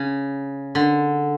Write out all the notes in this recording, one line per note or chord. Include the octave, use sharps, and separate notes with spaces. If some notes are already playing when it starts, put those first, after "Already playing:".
Already playing: C#3
D3